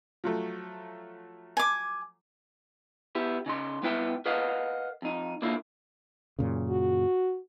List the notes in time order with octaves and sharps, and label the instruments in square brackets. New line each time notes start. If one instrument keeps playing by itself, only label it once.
[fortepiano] F3 F#3 A3
[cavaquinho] G#5 D6
[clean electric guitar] B3 E4 G4
C#3 D#4 C6
G3 B3 E4 B4 E5 G5
A#4 B4 D#5 F5 F#5
F2 D#4
A#2 D3 A#3 E4
[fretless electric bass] F#2 A#2 C#3
[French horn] F#4